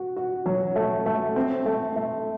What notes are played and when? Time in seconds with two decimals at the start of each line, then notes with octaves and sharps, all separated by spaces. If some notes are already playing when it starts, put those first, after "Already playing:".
Already playing: F#4
0.16 F#4
0.46 F#3
0.76 A3
1.06 A3
1.36 C4
1.66 A3
1.96 A3